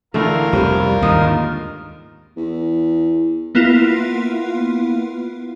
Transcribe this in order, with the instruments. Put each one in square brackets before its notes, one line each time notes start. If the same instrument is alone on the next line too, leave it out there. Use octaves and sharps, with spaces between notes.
[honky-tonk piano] D2 D3 E3 [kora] A3 [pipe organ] F4 A#4 F5
[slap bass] C2 F2 [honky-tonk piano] G3 C4
[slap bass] D#2 G#2 D3 [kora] D#4
[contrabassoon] E2
[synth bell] A#3 B3 E4 F4